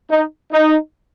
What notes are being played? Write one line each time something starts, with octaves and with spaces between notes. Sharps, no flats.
D#4
D#4